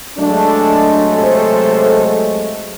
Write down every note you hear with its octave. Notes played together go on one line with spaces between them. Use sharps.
F#3 G#3 A3 D4
C3 A4 C5